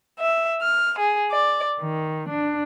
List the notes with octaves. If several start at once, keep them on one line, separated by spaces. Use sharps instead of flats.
E5
F6
G#4
D5
D#3
D4